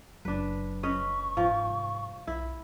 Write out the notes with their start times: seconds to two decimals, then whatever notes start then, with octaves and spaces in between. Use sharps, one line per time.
0.25 F#1 F#3 D4 B4
0.83 C#4 B4 D#5 C#6
1.37 G#2 F3
1.65 F1 G3
2.27 B1 E4